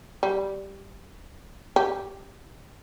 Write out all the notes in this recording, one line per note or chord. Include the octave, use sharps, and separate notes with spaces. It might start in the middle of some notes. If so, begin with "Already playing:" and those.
G3
G4